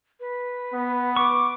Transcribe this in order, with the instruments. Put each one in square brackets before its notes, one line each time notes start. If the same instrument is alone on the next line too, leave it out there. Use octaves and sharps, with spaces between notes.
[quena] B4
[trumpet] B3
[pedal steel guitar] C#6 [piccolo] D6